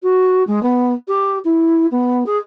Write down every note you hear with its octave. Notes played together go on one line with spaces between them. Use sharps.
F#4
G#3
B3
G4
E4
B3
G#4